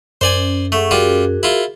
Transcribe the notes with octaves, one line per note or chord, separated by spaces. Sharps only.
F#2 C5 D5 G#5
A3 G#4 F#5 C#6
G3 F4 F#4 G#4 A#4
E4 F4